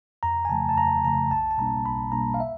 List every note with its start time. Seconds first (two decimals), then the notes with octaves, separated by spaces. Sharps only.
0.23 F2 A#5
0.45 G#5
0.49 C#3 F3 A3 A5
0.69 A5
0.77 F2 A#5
1.04 C#3 F3 A3 A#5
1.31 B1 A5
1.51 A5
1.58 B2 G3 A#3 D4 A#5
1.86 B1 B5
2.12 B2 G3 A#3 D4 A#5
2.34 F5
2.40 E5